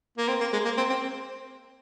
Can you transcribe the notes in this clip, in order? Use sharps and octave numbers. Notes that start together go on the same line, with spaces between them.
A#3
C4
A#3
G#3
A#3
C4
C4